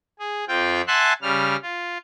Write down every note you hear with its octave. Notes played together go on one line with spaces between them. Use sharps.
G#4
F2 C4 F4 G5
E5 F#5 G#5 A5 C6 F#6
C#3 G3 F6
F4